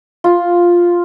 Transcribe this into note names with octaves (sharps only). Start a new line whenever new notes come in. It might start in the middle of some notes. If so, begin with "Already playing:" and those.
F4